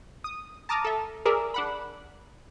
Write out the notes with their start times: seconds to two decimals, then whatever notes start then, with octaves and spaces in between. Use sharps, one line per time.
0.24 D#6
0.69 A5 A#5 D6 D#6 F6
0.85 A4 E5
1.25 G#4 A#4 D5 E5
1.54 D4 F#5 B5